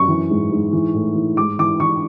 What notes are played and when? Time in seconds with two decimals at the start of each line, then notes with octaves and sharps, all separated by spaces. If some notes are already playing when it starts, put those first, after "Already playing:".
Already playing: F#2 C#6
0.08 E3
0.30 G#2
0.52 G#2
0.73 E3
0.95 A2
1.15 E3
1.37 G#2 D6
1.59 E3 D6
1.80 E3 C#6